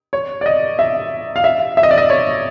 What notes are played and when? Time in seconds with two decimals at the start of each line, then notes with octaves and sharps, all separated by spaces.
0.13 C#5
0.41 D5
0.46 D#5
0.79 E5
1.36 F5
1.44 E5
1.77 E5
1.83 D#5
1.91 D5
1.98 D#5
2.10 C#5